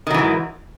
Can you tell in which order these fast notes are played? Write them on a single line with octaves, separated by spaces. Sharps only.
D#3 F#3 E3 G#2